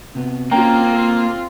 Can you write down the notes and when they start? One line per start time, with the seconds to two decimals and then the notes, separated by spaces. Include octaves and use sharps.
0.15 C3 B3
0.51 A#3 C4 C#4 F4 G5 A#5
0.93 A4 F5